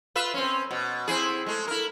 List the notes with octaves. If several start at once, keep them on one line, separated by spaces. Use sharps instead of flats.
F4 B4 E5
C4 C#4
B2
C4 E4 G#4
G#3 A3
E4 A#4